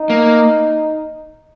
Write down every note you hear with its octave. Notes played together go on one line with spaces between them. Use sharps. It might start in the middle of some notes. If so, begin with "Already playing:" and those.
Already playing: D#4
A#3